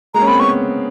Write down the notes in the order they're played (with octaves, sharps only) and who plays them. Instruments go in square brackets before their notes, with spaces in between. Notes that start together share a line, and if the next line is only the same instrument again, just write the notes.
[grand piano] G#3 A#3 [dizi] A#5
[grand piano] C#4
[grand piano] A#3 C4 [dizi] B5
[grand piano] B3 C#4 [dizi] C#6